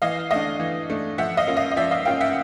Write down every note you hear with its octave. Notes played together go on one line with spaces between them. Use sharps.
E3 D#5 F5
A3 D4 D#5 F5
E3
A3 D4
F3 E5 F#5
D#5 F5
A#3 C#4 F4
D#5 F5
D#5
F3 D5 E5
D#5 F5
A#3 C#4 F4 F5 G5
E5 F#5